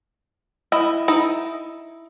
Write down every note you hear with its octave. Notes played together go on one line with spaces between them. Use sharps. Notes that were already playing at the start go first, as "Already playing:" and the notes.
E4 D#5
D#4 E4 D#5